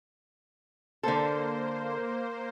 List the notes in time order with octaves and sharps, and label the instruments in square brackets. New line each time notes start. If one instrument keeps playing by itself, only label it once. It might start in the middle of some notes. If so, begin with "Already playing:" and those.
[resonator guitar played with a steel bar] D3 A4 [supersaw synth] A#3 C5